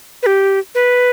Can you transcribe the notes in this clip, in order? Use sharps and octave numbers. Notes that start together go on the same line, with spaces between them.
B4
G4
B4